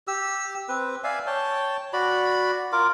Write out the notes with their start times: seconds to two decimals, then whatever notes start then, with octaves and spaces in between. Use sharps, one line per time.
0.07 G4 E6
0.69 C4 B4
1.04 D5 E5 F5 G#5
1.27 C#5 G5 A5
1.93 F#4 D5 B5
2.72 F4 A#4 D6